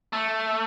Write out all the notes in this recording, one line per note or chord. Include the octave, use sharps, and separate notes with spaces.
A3